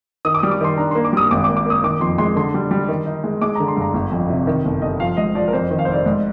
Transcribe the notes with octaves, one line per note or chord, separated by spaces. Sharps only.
D#3 D#6
D6
D#6
G3
D6
D#3 C6
D4 A#5
A#3 C6
D6
G3 D#6
G#1 D6
D6
A#3
D6
A#3 D#6
D#3 D6
F2 C6
G#3 C6
D3 C6
G3
G3
D#3
D#4
G#3
G#3 D6
A#5
D3
C6
G2 A#5
G1
F2
C3
D#3
G1
G1 D#5
F3 F5
G#2 D#5
F3 D5
A#4
F2 C5
D#3
F5
C5
F1 D5
G#2